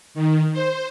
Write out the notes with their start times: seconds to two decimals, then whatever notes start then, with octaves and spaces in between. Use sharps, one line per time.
0.14 D#3
0.53 C5